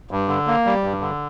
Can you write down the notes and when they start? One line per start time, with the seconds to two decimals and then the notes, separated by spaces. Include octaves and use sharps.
0.11 G2
0.28 D3
0.47 A#3
0.66 G3
0.84 G2
1.01 D3